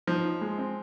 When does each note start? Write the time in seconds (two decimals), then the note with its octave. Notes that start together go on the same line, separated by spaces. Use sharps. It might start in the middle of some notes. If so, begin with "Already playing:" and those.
0.07 F3 D#4
0.25 D#4
0.41 G#3
0.58 C4